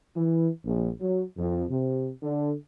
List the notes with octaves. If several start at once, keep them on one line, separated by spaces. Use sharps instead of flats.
E3
A#1
F#3
F2
C3
D3